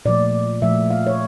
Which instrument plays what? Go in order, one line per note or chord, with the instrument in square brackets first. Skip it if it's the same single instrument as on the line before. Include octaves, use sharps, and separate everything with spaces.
[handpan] A#2 F3 A3 D5
A#2 F3 A3 E5
F5
C#5